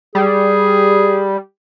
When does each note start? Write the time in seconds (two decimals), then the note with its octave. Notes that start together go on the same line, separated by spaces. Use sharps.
0.15 G3 G#4